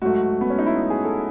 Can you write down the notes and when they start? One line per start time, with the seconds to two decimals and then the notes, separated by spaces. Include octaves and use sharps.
0.02 G#2 F#3 A3 F#4
0.41 B3
0.50 C#4
0.59 D#4
0.66 E4
0.75 F#4
0.90 G#4
1.04 A4